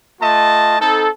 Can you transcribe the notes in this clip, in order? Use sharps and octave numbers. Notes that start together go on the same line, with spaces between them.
A3 F4 D#5 A5
C4 D#4 A4